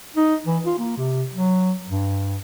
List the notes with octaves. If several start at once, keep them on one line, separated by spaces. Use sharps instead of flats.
D#4
E3
F4
A#3
C3
F#3
G2